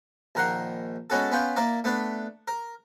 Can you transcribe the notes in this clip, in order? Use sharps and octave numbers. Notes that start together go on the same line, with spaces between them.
A#1 D#3 A#4 F#5 C6
G#3 B3 C#4 F#4 A4
B3 C#4 F4 G5
A#3 E4 A#4 D5
A3 B3 D4 B5
A#4